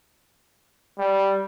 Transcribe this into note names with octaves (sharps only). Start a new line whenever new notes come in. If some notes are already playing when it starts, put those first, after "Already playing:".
G3